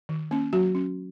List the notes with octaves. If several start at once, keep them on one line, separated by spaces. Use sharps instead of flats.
D#3
A#3 C#4
F#3 F#4
C#4